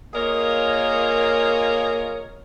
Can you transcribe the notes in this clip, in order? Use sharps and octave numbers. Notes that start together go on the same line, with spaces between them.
A#3 F4 G#4 A#4 C#5 D#5